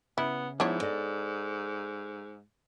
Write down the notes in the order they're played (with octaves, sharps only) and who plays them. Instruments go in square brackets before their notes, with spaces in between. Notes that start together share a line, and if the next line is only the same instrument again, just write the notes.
[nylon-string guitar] C#3 [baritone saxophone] B3 [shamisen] E4
[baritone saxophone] G#2 [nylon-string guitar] F3 E4 F4 [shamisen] B3 D4 C#5
[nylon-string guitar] A4 D5 D#5